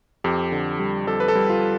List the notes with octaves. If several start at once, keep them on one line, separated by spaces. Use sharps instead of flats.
F2 G4
D3
G3
F2 A4
B4
A4
G3
F4